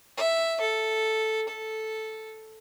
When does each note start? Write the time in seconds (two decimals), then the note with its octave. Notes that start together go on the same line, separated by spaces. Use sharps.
0.17 E5
0.61 A4
1.48 A4